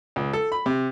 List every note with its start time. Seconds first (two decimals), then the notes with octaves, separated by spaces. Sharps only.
0.16 C#2
0.33 A4
0.52 B5
0.66 C3